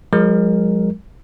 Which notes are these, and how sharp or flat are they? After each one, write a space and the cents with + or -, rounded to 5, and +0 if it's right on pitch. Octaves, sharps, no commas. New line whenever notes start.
F3 +35 G#3 -25 A#4 +0